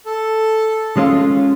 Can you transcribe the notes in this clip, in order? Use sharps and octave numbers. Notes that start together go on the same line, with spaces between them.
A4
G#3 C#4 F4